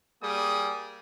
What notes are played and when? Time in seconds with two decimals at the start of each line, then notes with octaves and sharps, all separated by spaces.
0.22 G3 A#3 G#4 D#6